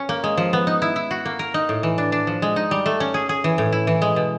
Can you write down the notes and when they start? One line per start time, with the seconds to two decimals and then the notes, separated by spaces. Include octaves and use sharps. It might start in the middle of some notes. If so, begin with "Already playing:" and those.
Already playing: C#4
0.09 A#3
0.24 G#3
0.37 F3
0.53 B3
0.67 D#4
0.82 E4
0.96 E4
1.11 F#4
1.25 A#3
1.39 A#4
1.54 D#4
1.69 A2
1.83 E3
1.98 D4
2.12 D4
2.27 F3
2.42 G#3
2.56 D#4
2.71 G3
2.86 A3
3.00 C#4
3.14 G#4
3.29 G#4
3.44 E3
3.58 A2
3.72 E4
3.87 E3
4.02 G#3
4.16 B2